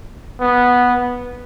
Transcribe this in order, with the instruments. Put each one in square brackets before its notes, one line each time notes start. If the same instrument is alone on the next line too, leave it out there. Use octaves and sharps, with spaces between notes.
[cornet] B3